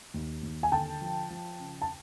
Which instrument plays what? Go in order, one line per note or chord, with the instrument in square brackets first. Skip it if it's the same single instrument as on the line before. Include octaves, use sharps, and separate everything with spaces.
[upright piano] D#2
D#2
G#5
D3 G5 A5
F3
F3
C#3
A5